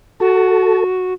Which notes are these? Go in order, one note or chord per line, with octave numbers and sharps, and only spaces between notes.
F#4 A4